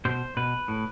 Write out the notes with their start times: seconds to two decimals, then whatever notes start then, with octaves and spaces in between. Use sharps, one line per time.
0.05 B2 C5
0.37 B2 B4
0.68 A2